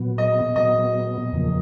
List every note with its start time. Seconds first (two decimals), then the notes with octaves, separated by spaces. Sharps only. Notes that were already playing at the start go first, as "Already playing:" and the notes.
Already playing: A#2 F#3 B3
0.18 D#5
0.56 A#2 F#3 B3 D#5
1.32 E2 C#3 F3 A#3